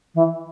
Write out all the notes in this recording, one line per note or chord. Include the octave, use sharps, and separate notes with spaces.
E3